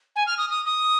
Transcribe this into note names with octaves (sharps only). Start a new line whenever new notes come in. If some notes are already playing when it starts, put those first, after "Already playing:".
G#5
F6
D#6
D#6
D#6